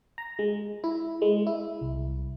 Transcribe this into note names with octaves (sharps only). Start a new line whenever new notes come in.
A#5
G#3
E4
G#3
E4
C2